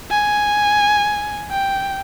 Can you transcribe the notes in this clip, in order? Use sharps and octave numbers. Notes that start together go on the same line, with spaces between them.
G#5
G5